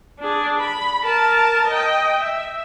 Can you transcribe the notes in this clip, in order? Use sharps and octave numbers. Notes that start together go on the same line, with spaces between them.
D4 G#4
B5
A#4 A5
D#5 G5
E5